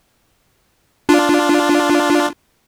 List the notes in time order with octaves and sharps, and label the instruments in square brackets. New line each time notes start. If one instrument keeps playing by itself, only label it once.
[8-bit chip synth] D4 F4